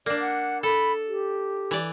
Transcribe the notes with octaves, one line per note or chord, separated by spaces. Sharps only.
A#3 D4 D5
F#5
A4 B5
G4
E3 D5